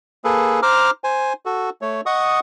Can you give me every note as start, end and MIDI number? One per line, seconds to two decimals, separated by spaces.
0.24 0.60 58
0.24 0.60 68
0.24 0.60 69
0.24 0.60 71
0.62 0.91 72
0.62 0.91 82
0.62 0.91 86
0.62 0.91 89
1.04 1.33 72
1.04 1.33 80
1.46 1.70 66
1.46 1.70 69
1.82 2.01 57
1.82 2.01 73
2.06 2.40 75
2.06 2.40 78
2.06 2.40 85
2.06 2.40 87